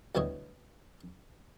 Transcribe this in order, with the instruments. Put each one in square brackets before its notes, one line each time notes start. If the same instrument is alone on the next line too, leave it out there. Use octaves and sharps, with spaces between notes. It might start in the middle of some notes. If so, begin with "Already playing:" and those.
[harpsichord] D2 B2 G3 E4 C#5 D#5